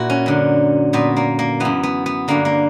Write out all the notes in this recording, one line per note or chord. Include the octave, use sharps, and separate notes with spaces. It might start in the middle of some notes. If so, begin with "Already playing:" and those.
Already playing: A#2 E4 F#4
C#4
F#2 D3
A#2 B3
A#3
A#3
F#2 E3 B3
B3
B3
G2 D3 A#3
A#3